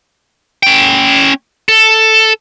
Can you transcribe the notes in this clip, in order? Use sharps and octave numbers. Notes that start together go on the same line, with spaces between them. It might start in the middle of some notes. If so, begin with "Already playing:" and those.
C#4 G5
A4